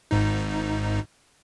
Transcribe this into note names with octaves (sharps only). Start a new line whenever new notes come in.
G#1 G#2 D#4